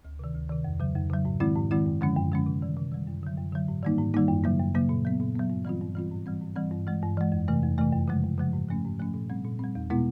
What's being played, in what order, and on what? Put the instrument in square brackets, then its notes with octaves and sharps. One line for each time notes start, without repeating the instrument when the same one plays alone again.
[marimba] D2
C3 D#3
D2
C3 D#3
F2
C#3 F#3
F2
C#3 F#3
G#2
D#3 G#3 C4 E4
G#2
D#3 G#3 C4 E4
F#2
D3 F3 G#3 C#4
F#2
D3 F3 G#3 C#4
C3
D#3 G3
C3
D#3 G3
F#2
D3 F#3
F#2
D3 F#3
G#2
D#3 G3 A#3 D#4
G#2
D#3 G3 A#3 D#4
F#2
C#3 F#3 A#3
F#2
C#3 F#3 A#3
A#2
F#3 B3
A#2
F#3 B3
G2
E3 G3 C4 F4
G2
E3 G3 C4 F4
G#2
E3 G3 C4
G#2
E3 G3 C4
G2
E3 G#3
G2
E3 G#3
F2
C3 E3 A3
F2
C3 E3 A3
F#2
C#3 F3 G#3
F#2
C#3 F3 G#3
G#2
F3 A3 C#4
G#2
F3 A3 C#4
A#2
G3 C4
A#2
G3 C4
E2
B2 G#3 B3 E4